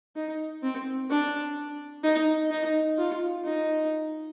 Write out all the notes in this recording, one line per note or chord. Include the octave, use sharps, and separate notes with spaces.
D#4
C4
D4
D#4
D#4
F4
D#4